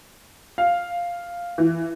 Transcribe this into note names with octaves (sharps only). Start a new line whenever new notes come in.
F5
E3